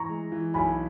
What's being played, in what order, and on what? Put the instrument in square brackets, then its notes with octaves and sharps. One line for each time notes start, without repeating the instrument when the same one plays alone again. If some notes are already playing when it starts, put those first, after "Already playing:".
Already playing: [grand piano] E3 [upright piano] A#5 C#6
[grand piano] G#3
E3
[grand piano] B1 [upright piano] G#5 B5